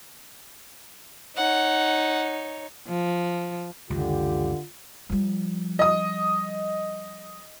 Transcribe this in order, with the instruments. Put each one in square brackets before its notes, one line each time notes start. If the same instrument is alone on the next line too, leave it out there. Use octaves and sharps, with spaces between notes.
[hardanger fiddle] D#4 C#5 [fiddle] F#5
[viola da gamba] F3
[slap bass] C#2 F#2 D#3 [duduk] D3 [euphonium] F4 [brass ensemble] G4
[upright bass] F3 G3
[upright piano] D#5 D#6